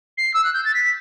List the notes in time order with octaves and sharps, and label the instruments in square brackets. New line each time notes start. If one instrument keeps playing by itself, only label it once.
[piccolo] C7
E6
F#6
G6
A6
B6